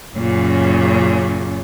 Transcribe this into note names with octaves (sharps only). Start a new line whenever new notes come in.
F#2 A#2 C#3